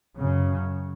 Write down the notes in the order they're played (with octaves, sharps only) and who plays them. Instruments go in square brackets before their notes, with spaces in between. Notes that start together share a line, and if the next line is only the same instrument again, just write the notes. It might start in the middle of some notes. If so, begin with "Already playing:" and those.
[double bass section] F#2 C#3